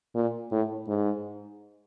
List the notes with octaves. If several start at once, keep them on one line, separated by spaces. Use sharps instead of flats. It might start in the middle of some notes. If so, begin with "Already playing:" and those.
A#2
A2
G#2